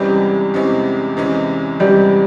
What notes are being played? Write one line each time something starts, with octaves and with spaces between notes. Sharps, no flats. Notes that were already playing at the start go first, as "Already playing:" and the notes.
Already playing: E2 C3 E3 G3 G#3 C#4
E2 C3 E3 G#3 C#4
E2 C3 E3 G#3 C#4
E2 C3 E3 G3 G#3 C#4